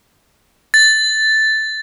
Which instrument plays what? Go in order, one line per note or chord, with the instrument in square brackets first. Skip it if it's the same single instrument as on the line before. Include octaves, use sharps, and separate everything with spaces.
[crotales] A6